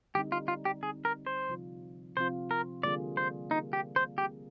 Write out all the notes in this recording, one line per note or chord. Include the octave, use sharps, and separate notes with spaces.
D3 G3 C4 D#4 G4
F4
F4
G4
D3 G3 C4 D#4 G#4
A#4
C5
C3 F3 C4 F4
C3 F3 C4 F4 C5
A#4
D3 G3 A#3 F4 G#4 D5
C5
D3 G3 A#3 D#4 F4 G#4
G4
C5
G3 C4 F4 G4 G#4